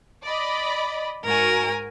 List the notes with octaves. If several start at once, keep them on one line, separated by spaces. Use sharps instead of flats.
D5 D#5 B5
G#2 F#4 A#4 G#5